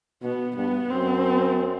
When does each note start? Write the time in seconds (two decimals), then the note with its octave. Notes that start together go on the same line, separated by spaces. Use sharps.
0.22 B2 B3
0.56 G2 B3
0.90 F#2 C4